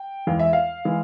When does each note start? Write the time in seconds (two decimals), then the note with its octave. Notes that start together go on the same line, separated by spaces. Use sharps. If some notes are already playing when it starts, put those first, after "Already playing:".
Already playing: G5
0.27 E2 E3 G#3 F5
0.39 E5
0.53 F5
0.85 E3 G#3